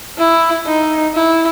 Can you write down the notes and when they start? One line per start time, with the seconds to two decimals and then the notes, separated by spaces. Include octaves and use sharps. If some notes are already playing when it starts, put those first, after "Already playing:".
0.18 E4
0.67 D#4
1.14 E4